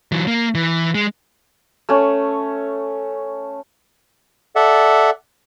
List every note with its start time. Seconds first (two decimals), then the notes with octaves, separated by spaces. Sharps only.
0.12 E3 F#3
0.27 A#3
0.55 E3
0.95 G#3
1.89 A3 C#4
4.56 A4 D5 E5 F#5